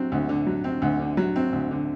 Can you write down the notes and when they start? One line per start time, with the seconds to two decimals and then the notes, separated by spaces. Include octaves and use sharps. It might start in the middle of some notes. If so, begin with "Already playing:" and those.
Already playing: D3 F#3 C4
0.12 D2
0.29 D3
0.46 F#3
0.64 C4
0.82 D2
0.99 D3
1.17 F#3
1.36 C4
1.53 D2
1.71 D3